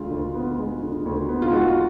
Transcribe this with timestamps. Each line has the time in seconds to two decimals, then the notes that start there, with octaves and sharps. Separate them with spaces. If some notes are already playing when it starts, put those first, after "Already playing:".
Already playing: D2 D3 G#3 F4
0.11 D2
0.35 B3
0.58 G#3
0.82 D3
1.06 D2
1.29 B3
1.42 F4
1.52 G#3 F#4